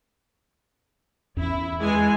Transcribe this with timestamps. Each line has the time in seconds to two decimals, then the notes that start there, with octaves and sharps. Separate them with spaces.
1.37 E2 C#4 E4
1.81 E3 G#3 G#5